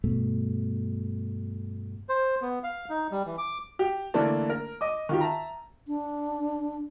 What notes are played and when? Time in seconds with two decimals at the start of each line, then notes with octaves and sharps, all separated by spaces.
0.04 G2 B2 A3
2.09 C5
2.42 B3
2.64 F5
2.90 D#4
3.11 G3
3.26 E3
3.38 D6
3.79 G4
4.14 D3 E3 A3 A#3 D4
4.50 A#4
4.81 D#5 D6
5.09 D#3 F4 G4
5.21 E5 A5 A#5
5.88 D4